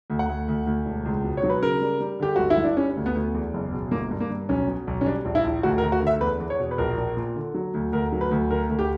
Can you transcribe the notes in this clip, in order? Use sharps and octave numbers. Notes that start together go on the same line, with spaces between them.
D2
F#5
D2
D2
D2
E1
C#2
B2
C#5
F#3
B4
C#3 A#4
G3
G3
D3 G4
G1 F#4
E4
G1
D4
G3 C#4
D2
B3
D2
E2
F#1
B2
G1 A#3
G2
A#3
G2
B1 C#4
B2
B1
C#4
G3 D4
A#1
E4
A#1
D2 F#4
A#4
D2
F#4
D3 E5
E2 B4
E2
C#5
B2
B4
A#1 A#4
A#1
A#2
D3
F#3
D2
D2 A#4
F#3
B4
D2
D3 A#4
D2
G4